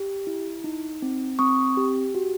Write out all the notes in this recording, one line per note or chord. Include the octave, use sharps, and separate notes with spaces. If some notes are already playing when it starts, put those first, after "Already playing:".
Already playing: G4
E4
D#4
C4
C4 C#6 D#6
G4
F#4